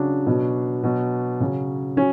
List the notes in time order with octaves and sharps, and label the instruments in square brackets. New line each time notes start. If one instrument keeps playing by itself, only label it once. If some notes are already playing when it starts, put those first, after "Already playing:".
Already playing: [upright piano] C#3 F#3 D4
B2 F#3
B2 F#3
C#3 F#3
F#3 C#4